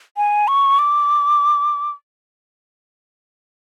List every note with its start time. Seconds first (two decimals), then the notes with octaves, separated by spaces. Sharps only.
0.17 G#5
0.48 C#6
0.79 D6